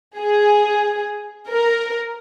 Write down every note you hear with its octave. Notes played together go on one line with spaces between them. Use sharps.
G#4
A#4